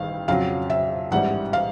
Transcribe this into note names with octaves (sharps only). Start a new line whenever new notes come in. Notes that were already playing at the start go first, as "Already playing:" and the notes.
Already playing: A1 G2 D#3 F5
F2 C#3 F#3 F5
E5
A1 G#2 E3 G3 F#5
F5